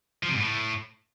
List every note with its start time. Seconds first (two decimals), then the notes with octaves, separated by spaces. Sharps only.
0.23 F3
0.29 C3
0.34 G#2
0.40 A2